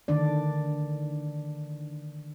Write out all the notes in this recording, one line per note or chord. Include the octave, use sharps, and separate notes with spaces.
D3 D#3 D4 D5